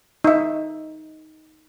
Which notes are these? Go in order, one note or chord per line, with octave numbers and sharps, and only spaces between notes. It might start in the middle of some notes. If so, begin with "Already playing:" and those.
D#4 E5